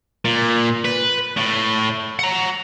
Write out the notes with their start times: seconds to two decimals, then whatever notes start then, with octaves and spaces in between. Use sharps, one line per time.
0.25 A#2
0.85 B4
1.37 A2
2.19 F#5 A#5